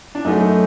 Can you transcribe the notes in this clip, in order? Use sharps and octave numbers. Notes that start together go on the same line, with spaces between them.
D4
F#2 F#3 A3 D#4